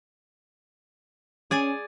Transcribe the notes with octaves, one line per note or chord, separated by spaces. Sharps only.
C#4 G#4 D5 G#5